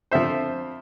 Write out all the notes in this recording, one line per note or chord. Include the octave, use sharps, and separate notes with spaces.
F2 D3 F3 C5 E5